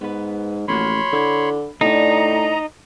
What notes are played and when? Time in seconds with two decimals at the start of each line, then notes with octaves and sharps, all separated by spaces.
0.01 G#2 B3 B4
0.68 A1 F3 A#3 F#4 C#5 B5 C6
1.13 D3 E4
1.81 A2 D4 D#4 D#5 A5 A#5